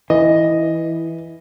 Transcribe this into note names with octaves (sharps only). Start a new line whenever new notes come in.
E3 D#5